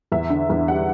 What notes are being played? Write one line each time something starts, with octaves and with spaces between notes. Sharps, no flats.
E2 E5
D3
E2
G3 F#5